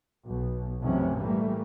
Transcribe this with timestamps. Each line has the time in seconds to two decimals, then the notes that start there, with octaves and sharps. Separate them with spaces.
0.24 B1 B2
0.80 F1 F#2 C3 E3 C#4
1.15 A1 E3 G3 A3 A#3